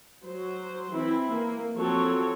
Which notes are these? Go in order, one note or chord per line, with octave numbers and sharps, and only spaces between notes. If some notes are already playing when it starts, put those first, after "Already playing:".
F#3 C5
E3 C4 E4
A#3
F3 F#3 C4 A4 C#5